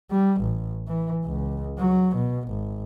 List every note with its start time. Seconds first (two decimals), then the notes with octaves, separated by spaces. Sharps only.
0.11 G3
0.41 A1
0.88 E3
1.25 C#2
1.78 F#3
2.16 B2
2.48 G#1